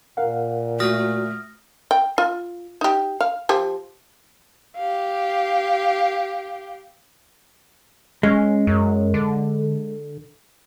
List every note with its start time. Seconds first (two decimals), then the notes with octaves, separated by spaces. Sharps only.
0.17 A#2 A#4 F5 F#5
0.80 A3 F#4 D#6 F6 A#6
1.91 G5
2.18 F4
2.81 D#4 G4
3.21 F5
3.49 F3 G4
4.76 G4 F5
8.23 G#3 C#4
8.67 F#2
9.14 D3